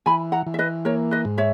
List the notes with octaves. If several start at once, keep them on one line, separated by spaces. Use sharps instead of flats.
E3 G#5 B5
F#5 A#5
E3
E5
B4 D#5
A#3 A#4 C#5
B4 D#5
G#2
C#5 E5